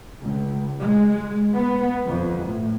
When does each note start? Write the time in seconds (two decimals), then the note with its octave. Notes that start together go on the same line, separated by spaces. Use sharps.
0.21 C#2
0.82 G#3
1.54 B3
2.04 F2
2.44 A2